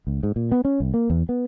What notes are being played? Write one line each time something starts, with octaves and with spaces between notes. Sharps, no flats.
C#2
G#2
A#2
B3
C#4
C2
A#3
E2
B3